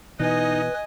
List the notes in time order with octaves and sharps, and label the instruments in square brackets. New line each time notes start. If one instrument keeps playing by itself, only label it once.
[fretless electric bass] B2 E3 [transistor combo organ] D#4 [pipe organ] B4 [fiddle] D#5 G#5